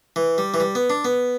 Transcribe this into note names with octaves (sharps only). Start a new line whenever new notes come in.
E3
G3
E3
G3
B3
D4
B3